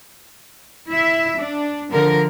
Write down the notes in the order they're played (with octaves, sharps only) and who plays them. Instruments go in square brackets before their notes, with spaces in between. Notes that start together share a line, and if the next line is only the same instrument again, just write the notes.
[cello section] E4 E5
D4
D3 F3 A#4